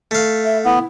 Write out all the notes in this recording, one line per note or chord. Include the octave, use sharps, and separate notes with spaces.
A3 F5
E5
B3 E4